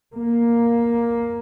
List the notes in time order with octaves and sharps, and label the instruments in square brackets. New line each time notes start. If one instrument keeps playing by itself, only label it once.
[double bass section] A#3